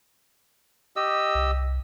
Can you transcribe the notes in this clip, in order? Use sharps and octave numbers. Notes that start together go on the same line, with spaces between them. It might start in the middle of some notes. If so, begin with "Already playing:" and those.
G4 D#5 E6
C2